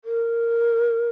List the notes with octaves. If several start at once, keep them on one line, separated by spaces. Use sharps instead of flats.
A#4